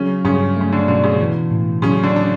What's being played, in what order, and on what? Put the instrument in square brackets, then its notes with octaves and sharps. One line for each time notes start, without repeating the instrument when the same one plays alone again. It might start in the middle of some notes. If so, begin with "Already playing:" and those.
Already playing: [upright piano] C#3 C#4 [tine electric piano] F#3
[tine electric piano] G2 [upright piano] C#3 C#4
[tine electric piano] A3 [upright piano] C#4
[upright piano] D3 D4
[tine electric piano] B2 [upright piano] D3 D4
[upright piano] C#3 C#4
[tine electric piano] E3
A2
[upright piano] C#3 C#4 [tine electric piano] F#3
[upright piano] D3 D4
D4